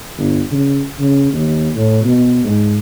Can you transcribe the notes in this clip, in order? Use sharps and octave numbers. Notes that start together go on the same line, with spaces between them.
G1
C#3
C#3
D#2
A2
B2
G#2